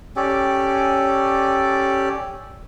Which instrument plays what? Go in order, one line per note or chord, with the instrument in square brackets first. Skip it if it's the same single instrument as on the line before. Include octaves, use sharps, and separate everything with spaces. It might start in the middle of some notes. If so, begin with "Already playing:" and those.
[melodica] C#4 G4 A4 D5